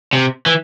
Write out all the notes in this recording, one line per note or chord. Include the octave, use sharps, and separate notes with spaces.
C3
E3